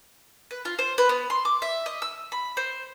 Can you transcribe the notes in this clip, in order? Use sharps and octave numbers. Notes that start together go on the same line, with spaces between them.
B4
F4
C5
B4
B3
C6
D6
E5
D#5
E6
B5
C5